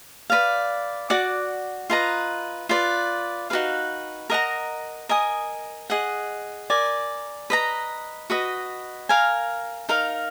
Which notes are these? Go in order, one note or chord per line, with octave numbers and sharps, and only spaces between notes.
B4 D5 F5
F#4 D5 F#5 D6
F4 B4 D#5 A#5
F4 B4 D5
D#4 F#4 B4 F5
A#4 D#5 F#5 A#5
A#4 D#5 G#5 D#6
G#4 D#5 F#5
A#4 D5 G#5
B4 D#5 A#5
F#4 B4 D#5
A#4 F5 G#5
D#4 A#4 F5